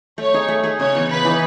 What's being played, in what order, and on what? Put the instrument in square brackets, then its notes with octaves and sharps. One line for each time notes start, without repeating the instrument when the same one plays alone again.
[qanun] A3 [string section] C#5
[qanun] D#4 G#4
A3
D#4 G#4
[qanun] C#3 [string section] C#5
[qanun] E3 B3 D#4
[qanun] C#3 [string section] B4
[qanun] E3 B3 D#4